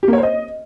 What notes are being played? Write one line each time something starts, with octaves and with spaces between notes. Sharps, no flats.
G4
A#3
C#5
C5
D#5